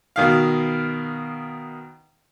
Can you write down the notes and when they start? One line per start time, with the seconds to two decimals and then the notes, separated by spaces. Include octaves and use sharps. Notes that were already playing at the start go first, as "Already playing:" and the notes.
0.16 B2 D#3 F5